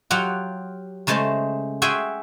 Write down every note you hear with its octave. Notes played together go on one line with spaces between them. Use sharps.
F#3 F4 G4 F#5
C#3 G#3 A3 C5 A5
F#4 G#4 E5 G5 G#5 C6